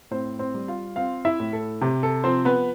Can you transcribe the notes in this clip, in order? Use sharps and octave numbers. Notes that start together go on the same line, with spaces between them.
A2 C4 C5
C4 C5
G3
F4 F5
C4 F4 F5
E4 E5
A2
A4
C3 G4
A4
F3 C4 C5
B3 B4